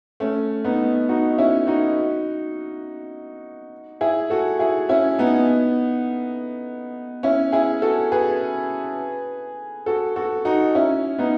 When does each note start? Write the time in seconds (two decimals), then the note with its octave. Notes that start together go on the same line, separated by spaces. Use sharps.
0.20 A3 C#4
0.64 B3 D#4
1.09 D#4 F#4
1.38 C#4 E4
1.67 D#4 F#4
4.01 E4 G#4
4.30 F#4 A4
4.59 E4 G#4
4.89 C#4 E4
5.18 B3 D#4
7.23 C#4 E4
7.52 E4 G#4
7.82 F#4 A4
8.12 G#4 B4
9.86 F#4 A4
10.16 F#4 A4
10.45 D#4 F#4
10.75 C#4 E4
11.18 B3 D#4